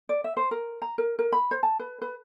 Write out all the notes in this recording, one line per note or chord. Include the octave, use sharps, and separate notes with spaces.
D5
E5
C5
A#4
A#5
A#4
A#4
B5
C5
A5
B4
B4